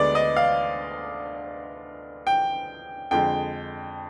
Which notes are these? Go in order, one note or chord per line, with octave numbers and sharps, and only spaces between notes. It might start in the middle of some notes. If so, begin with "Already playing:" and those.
Already playing: D2 D3 G#3 B3 D5
D#5
F5
G5
F2 D3 G#3 G5